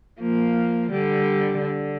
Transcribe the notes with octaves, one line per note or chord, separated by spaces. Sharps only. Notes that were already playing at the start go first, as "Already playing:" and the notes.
F3 A#3
D3 G3
D3